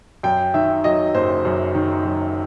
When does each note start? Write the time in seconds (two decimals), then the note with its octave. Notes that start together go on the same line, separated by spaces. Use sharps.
0.23 F#2 G5
0.54 D#3 E5
0.84 F#3 D#5
1.14 F#1 C5
1.45 F#2
1.75 D#3
2.05 F#3